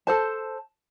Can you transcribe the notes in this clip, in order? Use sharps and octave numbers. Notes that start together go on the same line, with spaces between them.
A4 C5 A5